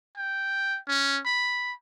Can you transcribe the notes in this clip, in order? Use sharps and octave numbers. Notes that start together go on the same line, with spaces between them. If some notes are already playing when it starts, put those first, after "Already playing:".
G5
C#4
B5